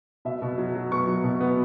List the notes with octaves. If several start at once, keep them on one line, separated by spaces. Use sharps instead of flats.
B2 E5
B2
F#3
F#3
B3 C#6
F#3
B2
B3